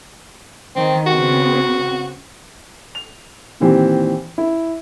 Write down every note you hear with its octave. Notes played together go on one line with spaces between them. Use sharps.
D#3 C4
C#3 B3 C4 F#4
F7
A#2 D#3 E3 C4 G4
E4